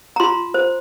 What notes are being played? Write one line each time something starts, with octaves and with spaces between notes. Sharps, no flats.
A#5
F4 C6
C5